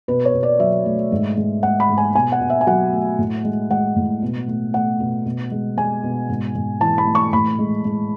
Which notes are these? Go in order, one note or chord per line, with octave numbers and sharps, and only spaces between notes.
B2 B4
C#5
B2
D5
F#3 E5
A3
G#2
G#3
G#3 F#5
B5
G#2
G#5
B2 G#5
F#5
B2
E5
G#5
F#3 F#5
A3
A2
G#3
G#3 F#5
A2
B2
A3
A3 F#5
B2
B2
G#3
G#3 G#5
B2
G#2
G#2
E3 A5
B5
A3
C#6
A2 B5
G#3
G#3